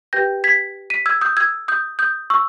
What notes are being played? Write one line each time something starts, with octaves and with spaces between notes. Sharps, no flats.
G4 B4 G5 G6 A#6
G#6 B6
B6 D#7
E6 G#6
D#6 G6
E6 G#6
D#6 G6
D#6 G6
C#6 E6